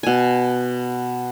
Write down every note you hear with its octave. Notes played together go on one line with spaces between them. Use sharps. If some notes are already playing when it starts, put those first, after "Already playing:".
B2 G#5